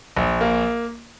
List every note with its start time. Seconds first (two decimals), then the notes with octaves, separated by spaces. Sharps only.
0.17 A#1
0.41 A#3